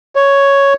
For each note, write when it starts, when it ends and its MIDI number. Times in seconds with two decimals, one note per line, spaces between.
0.16 0.74 73